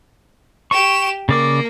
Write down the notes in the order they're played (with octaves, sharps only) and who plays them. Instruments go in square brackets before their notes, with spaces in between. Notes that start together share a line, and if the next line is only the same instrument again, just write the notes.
[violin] G4 E7 [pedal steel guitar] C#6
[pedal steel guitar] C#3 D5 D6 [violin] A#3